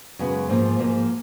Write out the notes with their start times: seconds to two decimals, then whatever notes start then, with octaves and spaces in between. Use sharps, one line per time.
0.19 F#2 C#3 G#3 B3
0.49 G#2 F3 A#3
0.79 G#2 F3 A#3